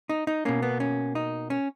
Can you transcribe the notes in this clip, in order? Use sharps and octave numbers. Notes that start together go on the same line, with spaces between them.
D#4
D#4
B2 A#3 C#4
B3
C#4
D#4
C#4